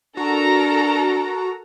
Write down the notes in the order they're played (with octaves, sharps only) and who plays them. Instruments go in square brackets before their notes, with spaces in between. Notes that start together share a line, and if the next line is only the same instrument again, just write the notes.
[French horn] D4 [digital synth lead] F#4 [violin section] A4 A#4 A#5